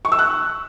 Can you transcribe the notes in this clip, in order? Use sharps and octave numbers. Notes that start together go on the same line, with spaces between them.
C#6
E6
F#6